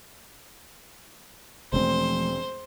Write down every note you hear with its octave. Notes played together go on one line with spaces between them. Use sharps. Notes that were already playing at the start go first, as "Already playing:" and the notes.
E1 F3 A3 C4 C5